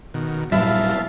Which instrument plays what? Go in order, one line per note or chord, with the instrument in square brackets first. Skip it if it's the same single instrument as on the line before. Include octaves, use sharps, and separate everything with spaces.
[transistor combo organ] B2 D#3
[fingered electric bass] A#2 F#3 G3 [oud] E4 [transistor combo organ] E5 F5 A5